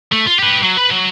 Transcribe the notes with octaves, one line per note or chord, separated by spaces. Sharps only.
A3
F4
G4 B4
F#3
B4 B5
F#3